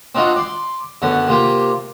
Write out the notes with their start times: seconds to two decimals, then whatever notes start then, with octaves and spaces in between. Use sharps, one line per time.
0.15 C4 D4 D#4 F4 F#4
0.36 D5 C6
1.02 F#2 D3 B3
1.28 C3 A#3 F4 G4